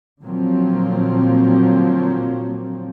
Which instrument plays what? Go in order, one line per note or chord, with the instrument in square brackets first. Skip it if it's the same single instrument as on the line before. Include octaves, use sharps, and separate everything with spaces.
[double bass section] A#2 D3 F3 F#3 A#3 C4